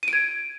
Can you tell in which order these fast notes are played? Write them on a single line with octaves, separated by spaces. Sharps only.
D#7 D7 G#6